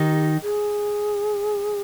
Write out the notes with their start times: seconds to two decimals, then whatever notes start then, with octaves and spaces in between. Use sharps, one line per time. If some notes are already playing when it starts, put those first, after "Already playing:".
Already playing: D#3 D#4 G4
0.43 G#4